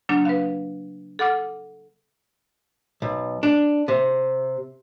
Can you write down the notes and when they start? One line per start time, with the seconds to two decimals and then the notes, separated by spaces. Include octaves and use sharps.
0.09 C#3 F#3 A#3 D4
0.25 B4 F5
1.19 A4 F#5 D6 F6
3.02 B1
3.43 D4
3.88 C3